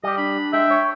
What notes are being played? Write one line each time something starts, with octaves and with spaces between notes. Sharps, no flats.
G3 G4 D#5
D4 B5
G#3 E5 G5
C#5